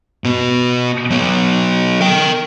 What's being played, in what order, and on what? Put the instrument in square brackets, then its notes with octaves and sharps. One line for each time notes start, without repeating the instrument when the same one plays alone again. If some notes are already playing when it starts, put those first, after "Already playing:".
[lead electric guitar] B2 B3
F#3 B3
A#4 G5